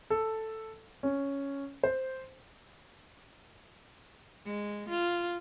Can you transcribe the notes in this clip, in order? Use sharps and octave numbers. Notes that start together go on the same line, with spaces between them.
A4
C#4
C5
G#3
F4